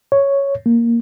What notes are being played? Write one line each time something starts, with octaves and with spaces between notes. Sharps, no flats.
C#5
A#3